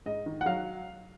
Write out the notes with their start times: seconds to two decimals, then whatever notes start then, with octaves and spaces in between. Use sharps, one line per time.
0.06 G#2 D#5
0.26 D#3
0.41 F#5
0.46 F#3 F5